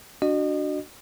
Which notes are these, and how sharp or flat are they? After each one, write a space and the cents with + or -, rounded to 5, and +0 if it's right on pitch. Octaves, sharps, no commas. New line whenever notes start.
D4 +0 F#4 +0 D#5 -35